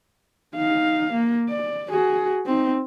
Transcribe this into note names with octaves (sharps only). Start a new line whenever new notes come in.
D#4 F5
A#3
D5
F#4 G#4
C4 D#4